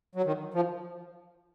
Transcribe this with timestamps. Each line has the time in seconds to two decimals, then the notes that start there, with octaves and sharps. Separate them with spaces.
0.15 F#3
0.25 D#3
0.54 F3